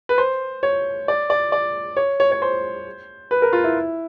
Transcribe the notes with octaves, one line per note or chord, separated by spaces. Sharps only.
B4
C5
C#5
D5
D5
D5
C#5
C#5
C#5
C5
B4
A#4
F4
E4